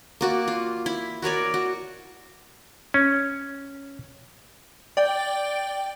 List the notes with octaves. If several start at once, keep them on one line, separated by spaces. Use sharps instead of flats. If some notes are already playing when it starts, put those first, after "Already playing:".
A#3 F#4 D5
F4
E4
F#4 A#4 C#5 D5
F#4
C#4
D5 G5